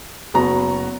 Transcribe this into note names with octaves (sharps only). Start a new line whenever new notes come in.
F#1 B3 F#4 A#5